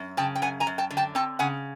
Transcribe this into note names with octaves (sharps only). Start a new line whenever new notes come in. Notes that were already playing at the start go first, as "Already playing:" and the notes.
Already playing: F#2
C#3 G5 A5
G5
F#2 F#5 G#5
G#5 A#5
F#2
G5 A5
D3
G5 A5
C4 G5 A5
C#3 F#5 G#5